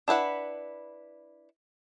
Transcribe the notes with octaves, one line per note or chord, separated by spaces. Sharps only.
D4 E4 B4 F#5